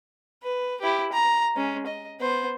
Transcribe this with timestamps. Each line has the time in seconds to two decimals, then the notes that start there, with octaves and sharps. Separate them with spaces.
0.43 B4
0.81 E4 G4
1.13 A#5
1.56 G#3 C#4
1.87 D#5
2.20 B3 C5